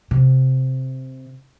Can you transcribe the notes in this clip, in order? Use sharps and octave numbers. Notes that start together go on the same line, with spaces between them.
C3